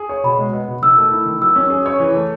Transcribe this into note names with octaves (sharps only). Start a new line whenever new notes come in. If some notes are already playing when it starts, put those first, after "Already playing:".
Already playing: G#4
C#5
B2 B5
G#3
B3
B2
D#3 E6
A3
E4
D#3
F#3 E6
C#4
G#4
C#5
E3
A3